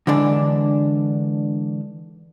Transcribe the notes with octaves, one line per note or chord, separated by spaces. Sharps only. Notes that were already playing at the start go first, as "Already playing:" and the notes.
D3 E3 G#3 D4